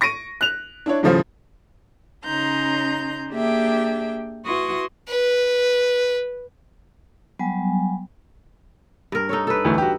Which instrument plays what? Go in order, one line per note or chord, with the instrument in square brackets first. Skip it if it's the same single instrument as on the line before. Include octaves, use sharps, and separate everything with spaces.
[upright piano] C#6 A#6 D7 D#7
F#6 F7
D4 E4 C#5
D#1 A2 C#3 F3 F4 C5
[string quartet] C#3 C#4 D#4 A#5 C6 G6
A#3 D4 G4 G#4 E5 G5
E4 F#4 B4 C6 C#6 D#6
[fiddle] B4
[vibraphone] F#3 G3 B3 G#5
[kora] G2 A#4
D#4 A4 C#5
A4 B4
[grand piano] D2 E3 A3
F#4 G4